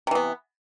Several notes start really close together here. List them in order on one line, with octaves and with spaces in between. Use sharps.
C3 E3 B3